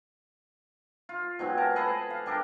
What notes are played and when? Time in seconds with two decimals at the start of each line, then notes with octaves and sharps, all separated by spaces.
1.09 F4
1.39 G#2 B2 F#3 C4
1.57 A#4 A5
1.76 G#4 A4 B4 D#5
2.10 F5
2.26 G3 D4 A4 A#4